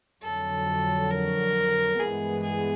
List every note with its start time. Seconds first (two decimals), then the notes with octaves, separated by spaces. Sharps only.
0.23 F2 D3 F#3 A4
1.11 A#4
2.00 G2 E3 G#3 B3 G#4
2.43 G#4